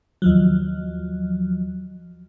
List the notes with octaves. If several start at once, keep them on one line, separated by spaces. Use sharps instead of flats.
D#2 F3 F#3